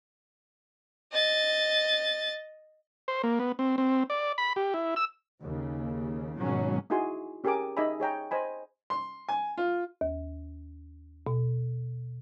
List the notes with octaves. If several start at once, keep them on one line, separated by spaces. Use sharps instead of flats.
D#5 A6
C5
A#3
B3
C4
C4
D5
B5
G4
E4
E6
D#2 C#3
G#1 B2 F#3 C#4
D#4 E4 F#4 G#4 G#5 C6
C#4 G4 G#4 A#4 G#5 D6
D#4 G#4 D#5 E5 G#5 B5
G#4 C#5 G5 A#5
C5 D#5 G#5 B5
C6
G#5
F4
D#2
B2